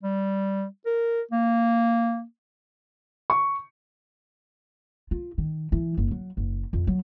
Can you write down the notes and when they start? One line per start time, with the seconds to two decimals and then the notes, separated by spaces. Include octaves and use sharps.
0.03 G3
0.86 A#4
1.31 A#3
3.30 C#6
5.11 F4
5.38 D#3
5.72 E3
5.97 F#1
6.11 F#3
6.37 F#1
6.73 F2
6.87 F#3